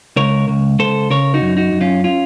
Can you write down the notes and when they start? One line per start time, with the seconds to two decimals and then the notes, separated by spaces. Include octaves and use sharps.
0.16 C#2 A#4 C#5
0.48 C#2
0.79 C#2 A4 C5
1.10 C#3 A#4 C#5
1.34 D#4 F#4
1.42 F#2
1.57 D#4 F#4
1.73 F#2
1.81 C#4 F4
2.04 C#4 F4